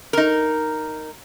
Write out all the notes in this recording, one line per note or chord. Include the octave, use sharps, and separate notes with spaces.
D#4 A#4